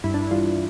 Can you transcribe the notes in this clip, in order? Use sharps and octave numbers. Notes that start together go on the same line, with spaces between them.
G2 E4
D4
E4
E3 G3 F4